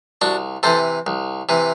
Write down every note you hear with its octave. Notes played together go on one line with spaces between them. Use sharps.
C2 D4 F#4
C3 E3 A4 C5
C2
C3 E3